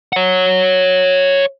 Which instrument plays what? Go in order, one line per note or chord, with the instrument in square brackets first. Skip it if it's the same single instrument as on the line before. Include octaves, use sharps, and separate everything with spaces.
[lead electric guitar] C#5 F#5